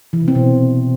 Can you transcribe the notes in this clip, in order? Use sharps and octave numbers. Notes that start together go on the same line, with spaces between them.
E3
C3
C4
B2